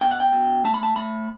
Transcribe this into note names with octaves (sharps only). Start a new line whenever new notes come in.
B2 G5
F#5
G5
B2
A3 A5
B5
A5
A3 B5